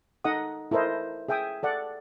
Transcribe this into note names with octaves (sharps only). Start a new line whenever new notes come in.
D#4 A4 D#5 F#5 D#6
E4 A4 A#4 C5 D#5
G#4 E5 G5 G#5 D#6
A4 D5 F#5